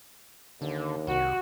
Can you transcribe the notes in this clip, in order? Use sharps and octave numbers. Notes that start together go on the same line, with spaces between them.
D#2 D3
C2 F#4